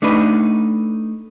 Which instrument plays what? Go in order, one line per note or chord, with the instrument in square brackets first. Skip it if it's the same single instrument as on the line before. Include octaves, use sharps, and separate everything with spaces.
[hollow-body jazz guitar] A3 D4 D#4 B4